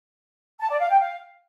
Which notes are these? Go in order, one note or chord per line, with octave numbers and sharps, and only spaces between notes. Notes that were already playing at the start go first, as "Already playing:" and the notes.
A5
D5
F5
G5
F5